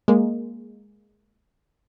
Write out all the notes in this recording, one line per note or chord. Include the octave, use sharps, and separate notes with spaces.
G#3 A#3